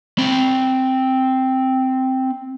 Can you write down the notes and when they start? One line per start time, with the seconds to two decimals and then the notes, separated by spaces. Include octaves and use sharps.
0.18 C4 B5